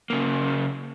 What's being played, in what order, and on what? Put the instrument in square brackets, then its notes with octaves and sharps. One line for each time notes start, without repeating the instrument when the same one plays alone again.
[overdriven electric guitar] C#3 A#3